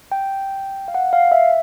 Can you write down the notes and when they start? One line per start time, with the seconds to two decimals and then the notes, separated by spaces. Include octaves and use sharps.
0.12 G5
0.88 F5
0.95 F#5
1.13 F5
1.32 E5